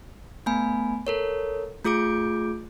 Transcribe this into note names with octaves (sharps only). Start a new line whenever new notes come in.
A3 B3 G#5 B5
A4 A#4 C#5
A3 F4 G#4 D6 G6 D7